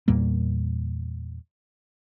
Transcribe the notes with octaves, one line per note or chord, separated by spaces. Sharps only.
E2 A#2 G3 A#3